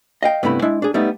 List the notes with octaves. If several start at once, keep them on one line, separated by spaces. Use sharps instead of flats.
D#5 F5 G5
G2 C3 A3 B3 E4 B5
G#3 D4 E4
D4 G#4
G3 A3 B3 D#4